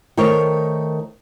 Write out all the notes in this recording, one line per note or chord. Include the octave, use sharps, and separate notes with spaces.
D#3 A3 A#4 C5 C#5